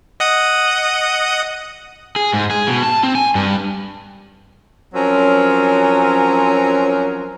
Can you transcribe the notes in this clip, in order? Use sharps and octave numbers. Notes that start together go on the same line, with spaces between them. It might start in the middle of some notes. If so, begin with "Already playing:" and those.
D#5 F#5 D#6
G#4
G#2
G#4
B2
A5
C4
G#5
G2
F3 F#3 C4 C#4 A#4